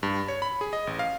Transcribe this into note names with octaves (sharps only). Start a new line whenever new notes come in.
G2
C#5
B5
G#4
D#5
A1
F5